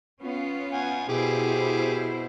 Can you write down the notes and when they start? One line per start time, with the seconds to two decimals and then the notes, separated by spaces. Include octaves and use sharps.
0.20 B3 C#4 F4
0.73 F#5 G#5
1.09 B2 E4 G4 G#4 C5